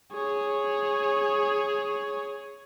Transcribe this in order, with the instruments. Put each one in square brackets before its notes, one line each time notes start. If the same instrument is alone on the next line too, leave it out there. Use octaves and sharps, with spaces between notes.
[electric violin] G#4 C#5